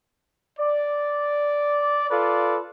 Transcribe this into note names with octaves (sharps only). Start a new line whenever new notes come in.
D5
F4 A4 B4 D5